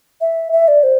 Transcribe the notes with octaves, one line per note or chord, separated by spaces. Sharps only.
E5
E5
D5
C5